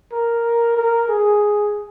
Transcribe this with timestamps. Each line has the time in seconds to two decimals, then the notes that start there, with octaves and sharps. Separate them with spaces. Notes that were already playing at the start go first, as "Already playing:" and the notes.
0.12 A#4
0.77 A#4
1.08 G#4